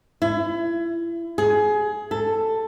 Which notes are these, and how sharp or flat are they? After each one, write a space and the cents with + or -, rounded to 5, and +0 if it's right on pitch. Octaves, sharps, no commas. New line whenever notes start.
E4 +30
G#4 +20
A4 +10